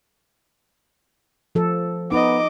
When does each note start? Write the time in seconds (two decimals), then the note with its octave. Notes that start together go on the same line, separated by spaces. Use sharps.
1.55 F3 A4
2.12 B3 D#4 D#5 D6